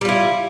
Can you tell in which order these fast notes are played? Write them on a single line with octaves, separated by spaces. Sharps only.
G3 F4 E4